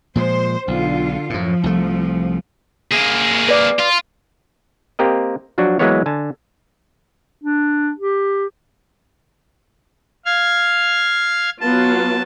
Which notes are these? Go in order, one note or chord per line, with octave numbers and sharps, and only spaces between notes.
A#2 F3 G#3 C5
B1 D3 F4
F#2 A2 F3
C2 A3
A#3 G#4
B4 D5
F4
A#3 C4 G4 A#4 D#5
F3 F#3 D4 F#4
E3 F#3 G#3 A#3 B3 C#5
D3 G#5 A5
D4
G4
F5 F6 G#6
F#3 B3 F4 A5